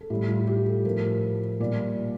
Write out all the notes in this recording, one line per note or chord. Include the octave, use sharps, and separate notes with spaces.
A4
A2 G3 G4
F4
G4
A4
A2 F3 A#4
A#2 G3 D5